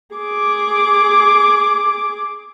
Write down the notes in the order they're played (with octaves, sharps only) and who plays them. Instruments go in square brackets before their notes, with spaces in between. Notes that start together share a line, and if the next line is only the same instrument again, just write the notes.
[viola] G#4 D6